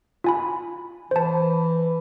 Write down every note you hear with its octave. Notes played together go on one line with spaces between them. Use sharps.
F4 G#5 B5
E3 C5 A5